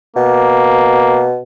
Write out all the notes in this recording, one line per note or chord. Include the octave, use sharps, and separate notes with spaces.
B2 A#3